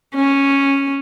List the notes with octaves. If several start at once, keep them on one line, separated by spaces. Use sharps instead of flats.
C#4